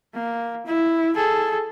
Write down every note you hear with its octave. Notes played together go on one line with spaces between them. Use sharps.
A#3
E4
G#4 A4